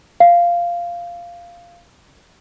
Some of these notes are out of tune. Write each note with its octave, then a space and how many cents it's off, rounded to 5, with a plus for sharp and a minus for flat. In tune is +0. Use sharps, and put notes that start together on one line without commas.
F5 -10